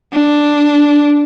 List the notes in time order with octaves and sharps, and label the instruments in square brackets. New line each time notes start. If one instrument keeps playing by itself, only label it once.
[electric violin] D4